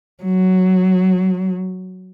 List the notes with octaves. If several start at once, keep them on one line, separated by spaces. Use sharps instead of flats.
F#3